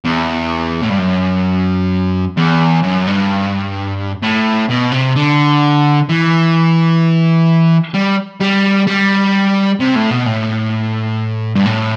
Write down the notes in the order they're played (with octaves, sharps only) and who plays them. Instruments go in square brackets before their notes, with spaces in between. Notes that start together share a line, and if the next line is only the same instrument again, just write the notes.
[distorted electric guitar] E2
A2
G2
F#2
E2
F#2
G2
A2
B2
C3
D3
E3
G3
G3
G3
C3
A2
B2
A2
G2
A2